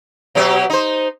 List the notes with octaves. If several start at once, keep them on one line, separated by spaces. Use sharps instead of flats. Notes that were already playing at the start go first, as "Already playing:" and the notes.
B2 F#3 G4
D#4 C5